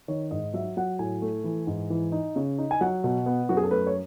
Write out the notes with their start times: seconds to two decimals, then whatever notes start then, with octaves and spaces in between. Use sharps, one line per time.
0.08 D#3 C#5
0.31 G#2 D#5
0.54 F#3 E5
0.77 F#3 F#5
0.99 A2 G#5
1.22 A3
1.44 E3
1.67 G#2
1.90 E3
2.12 D#4
2.36 C#3
2.58 D#4
2.71 G#5
2.81 F#3 F#5
3.04 B2
3.26 B3
3.49 F#2 F#4
3.57 G#4
3.63 A4
3.71 A3 B4
3.87 C#5